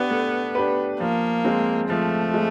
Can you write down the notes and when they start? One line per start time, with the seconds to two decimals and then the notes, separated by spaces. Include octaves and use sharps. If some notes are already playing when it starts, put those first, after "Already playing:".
Already playing: B3 D4 G4 B4
0.11 A3
0.55 D4 G4 B4
1.00 F3 A#3
1.45 G#3 C4
1.89 F3 A3
2.34 G#3